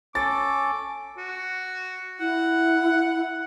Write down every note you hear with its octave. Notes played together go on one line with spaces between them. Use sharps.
C#4 A4 D6 A6
F#4
E4 F#5